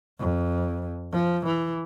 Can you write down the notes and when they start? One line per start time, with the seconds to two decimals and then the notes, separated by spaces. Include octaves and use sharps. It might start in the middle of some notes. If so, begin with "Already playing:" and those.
0.19 F2
1.12 F3
1.46 E3